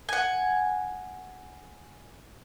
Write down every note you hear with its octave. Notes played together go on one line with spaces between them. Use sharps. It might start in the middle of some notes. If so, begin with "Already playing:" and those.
F#5 G#5